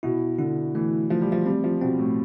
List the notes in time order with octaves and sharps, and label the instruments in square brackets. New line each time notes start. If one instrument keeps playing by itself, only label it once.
[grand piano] B2 [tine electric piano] E4
[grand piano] D3 [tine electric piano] E4
[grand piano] E3 [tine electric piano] A3
[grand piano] F3 [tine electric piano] A3
[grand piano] G3
F3
[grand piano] G3 [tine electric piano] C4
[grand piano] F3
[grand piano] B2 [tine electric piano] C4
[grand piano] A2